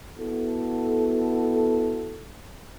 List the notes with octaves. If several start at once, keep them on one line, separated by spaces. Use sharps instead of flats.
B3 E4 F#4 A4